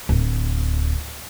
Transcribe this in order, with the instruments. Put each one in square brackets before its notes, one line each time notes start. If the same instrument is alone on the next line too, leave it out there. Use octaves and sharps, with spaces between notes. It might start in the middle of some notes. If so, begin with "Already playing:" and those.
[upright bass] D1